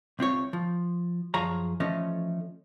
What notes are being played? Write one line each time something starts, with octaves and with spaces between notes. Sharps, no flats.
C2 C4 F4 C#5
F3
F#2 F3 G#4 C#5 A#5
E3 F3 A3 C#4 D#5